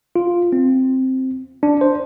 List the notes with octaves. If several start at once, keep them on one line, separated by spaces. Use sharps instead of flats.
F4
C4
D4
C5